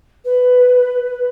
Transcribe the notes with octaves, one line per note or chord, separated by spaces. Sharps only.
B4